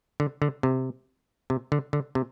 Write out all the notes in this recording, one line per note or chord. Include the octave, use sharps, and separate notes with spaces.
D3
D3
C3
C3
D3
D3
C3